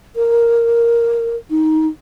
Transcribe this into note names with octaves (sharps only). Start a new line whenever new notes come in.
A#4
D#4